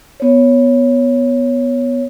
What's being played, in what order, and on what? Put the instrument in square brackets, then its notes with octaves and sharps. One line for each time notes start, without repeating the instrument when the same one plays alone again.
[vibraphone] B3 C#5